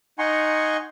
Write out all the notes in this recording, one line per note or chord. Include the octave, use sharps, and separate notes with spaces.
D#4 F#5 G#5 A#5 C6 C#6